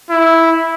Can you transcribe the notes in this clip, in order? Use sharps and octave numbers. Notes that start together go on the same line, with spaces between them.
E4